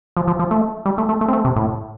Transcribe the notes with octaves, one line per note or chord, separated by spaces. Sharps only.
F3
F3
F3
A3
G3
A3
A3
A3
C4
A3
C3
A2